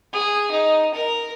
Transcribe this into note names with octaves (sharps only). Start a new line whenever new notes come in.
G#4
D#4
A#4